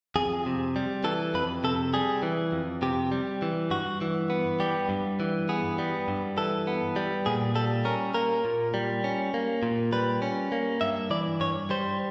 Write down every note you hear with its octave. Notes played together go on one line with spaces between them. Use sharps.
F2 G#4
C3
G3
E3 A4
F2 B4
C3 A4
G3 G#4
E3
F2
C3 G4
G3
E3
G2 F#4
E3
B3
G3 G4
G2
E3
B3 G#4
G3
G2
E3 A4
B3
G3
A#2 G#4
G3 A4
C#4 A#4
A#3 A#4
A#2
G3
C#4
A#3
A#2
G3 B4
C#4
A#3
G2 E5
E3 D5
G2 C#5
G3 C5